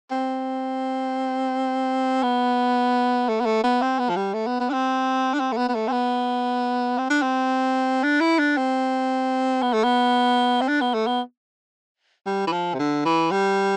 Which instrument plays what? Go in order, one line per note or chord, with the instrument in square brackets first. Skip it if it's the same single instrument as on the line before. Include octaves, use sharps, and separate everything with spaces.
[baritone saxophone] C4
B3
A3
B3
A3
B3
C4
B3
F3
G3
A3
B3
B3
D4
C4
D4
C4
A3
B3
B3
A3
C4
B3
C4
D4
C4
D4
E4
D4
C4
B3
A3
B3
C4
D4
B3
A3
B3
G3
E3
F3
C3
D3
E3
G3